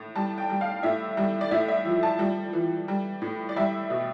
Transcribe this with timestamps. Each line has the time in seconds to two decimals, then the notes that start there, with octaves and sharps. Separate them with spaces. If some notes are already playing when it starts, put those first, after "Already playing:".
Already playing: A2
0.15 G3 A5
0.38 G5
0.50 G3
0.61 F5
0.83 A2 E5
1.17 G3
1.41 D5
1.51 A2 E5
1.68 E5
1.85 F3
2.03 A5
2.19 G3
2.53 E3
2.88 G3
3.22 A2
3.49 D5
3.56 G3 E5
3.90 B2